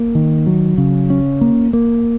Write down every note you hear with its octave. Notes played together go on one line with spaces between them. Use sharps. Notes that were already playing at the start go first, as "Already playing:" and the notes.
Already playing: A#3
D#3
F#3
C#3
C#4
A#3
A#3